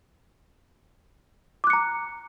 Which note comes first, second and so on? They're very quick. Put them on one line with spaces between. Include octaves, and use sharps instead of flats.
D6 F#6 C#7 A#5